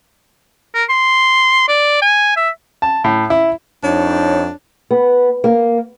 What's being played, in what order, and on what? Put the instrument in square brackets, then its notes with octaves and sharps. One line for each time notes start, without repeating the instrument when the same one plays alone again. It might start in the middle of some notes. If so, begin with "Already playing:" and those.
[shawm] A#4
C6
D5
G#5
E5
[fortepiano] A5
A2
E4
[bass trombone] F2 [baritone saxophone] D4 [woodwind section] D#4 [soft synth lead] C#5
[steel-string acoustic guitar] B3
A#3